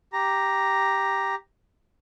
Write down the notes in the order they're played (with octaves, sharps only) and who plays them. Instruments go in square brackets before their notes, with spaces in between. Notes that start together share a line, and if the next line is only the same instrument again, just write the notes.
[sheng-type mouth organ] G4 A#5